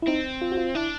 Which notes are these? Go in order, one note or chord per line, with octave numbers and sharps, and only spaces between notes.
E4
C4 D#4
F4
F#4
F4
D4 E4